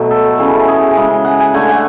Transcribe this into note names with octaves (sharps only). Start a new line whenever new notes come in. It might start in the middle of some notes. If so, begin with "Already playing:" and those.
Already playing: B2 F#3 A3
A4
C#3 E3 A3
G#4
C#3 G#3
F#5
G#5
D3 A3 G#5
F#5